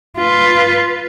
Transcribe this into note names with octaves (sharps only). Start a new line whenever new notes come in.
F4 B4